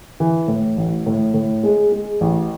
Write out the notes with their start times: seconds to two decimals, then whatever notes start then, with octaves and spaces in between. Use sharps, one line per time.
0.20 E3
0.48 A2
0.77 A1
1.06 A2
1.34 A2
1.63 G#3
1.92 G#3
2.21 A1